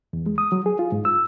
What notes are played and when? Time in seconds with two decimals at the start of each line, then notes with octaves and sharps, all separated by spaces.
0.13 E2
0.26 G#3
0.38 D#6
0.52 F#3
0.66 G#4
0.79 F4
0.92 G#2
1.05 E6